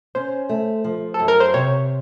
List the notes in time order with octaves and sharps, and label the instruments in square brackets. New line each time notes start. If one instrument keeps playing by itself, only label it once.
[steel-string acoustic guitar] C#4 [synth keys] C5
[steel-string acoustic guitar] A3
F3
[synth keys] A4
[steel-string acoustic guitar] F#2
[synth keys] A#4
C5
[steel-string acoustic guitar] C3 [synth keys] C#5